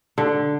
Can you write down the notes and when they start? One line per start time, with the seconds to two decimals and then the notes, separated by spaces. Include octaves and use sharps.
0.18 D3